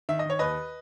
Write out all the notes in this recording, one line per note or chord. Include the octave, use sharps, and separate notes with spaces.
D#3 E5
D#5
D#3 C#5
D#2 B4 D#5